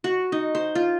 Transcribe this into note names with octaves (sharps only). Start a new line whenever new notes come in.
F#4
D#4
C5
F4